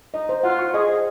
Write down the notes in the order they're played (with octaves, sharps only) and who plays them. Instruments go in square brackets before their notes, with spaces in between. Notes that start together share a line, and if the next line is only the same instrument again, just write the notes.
[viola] D#4 [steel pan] D#5
[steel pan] C5
[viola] F4 [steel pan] F#5
[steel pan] C#6
[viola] G#4 [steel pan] D#5
[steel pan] C5